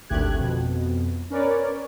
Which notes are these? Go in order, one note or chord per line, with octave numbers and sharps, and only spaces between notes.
G#1 D2 A3 G4 F#6 G#6
F2 B2
C#4 A#4 B4 C#5 D5